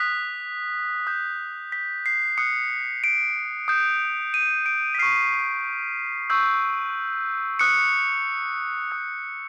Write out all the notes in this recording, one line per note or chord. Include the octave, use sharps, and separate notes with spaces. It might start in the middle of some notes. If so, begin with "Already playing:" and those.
Already playing: D#6 F#6 B6
D#6 G6
B6
C7
D#6 F#6 C#7
D7
D#6 G6
D#7
D7
B6
C#6 F6 C7
C#6 E6 G6
D#6 F#6 C#7
D#6 G6